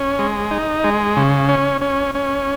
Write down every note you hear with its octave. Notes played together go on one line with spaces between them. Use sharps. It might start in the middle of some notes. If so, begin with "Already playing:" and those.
Already playing: C#4
G#3
D#4
G#3
C#3
C#4
C#4
C#4